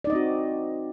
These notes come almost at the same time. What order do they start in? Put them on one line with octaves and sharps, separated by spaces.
D5 D#4 D#5 C4 F#4